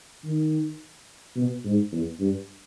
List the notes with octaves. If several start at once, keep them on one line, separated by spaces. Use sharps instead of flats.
D#3
B2
G#2
E2
G2